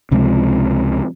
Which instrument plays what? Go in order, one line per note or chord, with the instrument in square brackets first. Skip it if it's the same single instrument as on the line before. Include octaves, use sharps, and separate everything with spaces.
[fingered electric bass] C#2 C3 F3 G#3